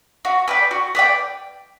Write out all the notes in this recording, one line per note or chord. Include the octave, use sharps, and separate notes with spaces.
F#4
B4 D5 G5
F#4
B4 D5 G5